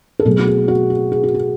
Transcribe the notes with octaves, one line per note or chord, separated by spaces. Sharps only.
A4
B2 F#3 A3 G#4
F#4
G#4
F#4
G#4
G#4
F#4
G#4